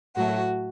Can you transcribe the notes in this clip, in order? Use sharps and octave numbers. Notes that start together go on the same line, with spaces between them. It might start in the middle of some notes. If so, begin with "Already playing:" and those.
A2 F#3 A3 F#4